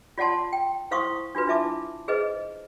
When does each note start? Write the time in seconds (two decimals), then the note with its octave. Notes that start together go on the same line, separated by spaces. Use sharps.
0.18 F4 D5 F#5 A5 C6
0.53 G5
0.91 E4 C5 F5 C6 C#6 D#6
1.35 D4 F4 F#4 B4
1.47 D4 E4 F4 E5 A5 D6
2.08 G#4 B4 C5 D#5